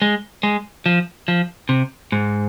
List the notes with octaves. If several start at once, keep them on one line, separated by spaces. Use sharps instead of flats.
G#3
G#3
F3
F3
C3
G#2